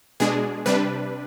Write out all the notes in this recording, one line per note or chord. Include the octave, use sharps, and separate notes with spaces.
B2 G#3 D4 G#4
C3 G3 D4 B4